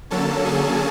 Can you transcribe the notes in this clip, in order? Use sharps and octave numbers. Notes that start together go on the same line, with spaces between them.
D3 F#3 A#3 C#4 A4 A5
G#4 G#5